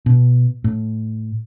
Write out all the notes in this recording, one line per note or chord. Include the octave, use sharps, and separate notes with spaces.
B2
A2